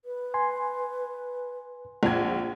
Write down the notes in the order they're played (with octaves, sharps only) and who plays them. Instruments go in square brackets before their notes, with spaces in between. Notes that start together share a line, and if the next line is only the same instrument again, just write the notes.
[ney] B4
[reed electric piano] G#5 C6
[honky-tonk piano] A#1 G#6 [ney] F#5